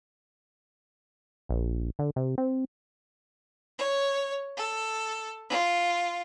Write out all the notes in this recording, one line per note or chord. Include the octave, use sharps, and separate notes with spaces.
A#1
D3
C3
C4
C#5
A4
F4